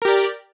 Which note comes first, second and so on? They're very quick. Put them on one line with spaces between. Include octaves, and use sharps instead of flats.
A#4 G4 D5